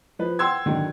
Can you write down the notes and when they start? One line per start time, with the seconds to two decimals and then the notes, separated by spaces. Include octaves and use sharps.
0.19 F3 B4
0.39 F#5 G5 C6 E6 G#6
0.66 D3 D#3 F#3